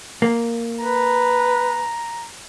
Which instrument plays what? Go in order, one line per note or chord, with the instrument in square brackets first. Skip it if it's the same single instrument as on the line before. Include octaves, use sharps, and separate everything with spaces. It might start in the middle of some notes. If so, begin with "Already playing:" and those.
[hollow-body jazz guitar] A#3
[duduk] B4 [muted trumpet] A#5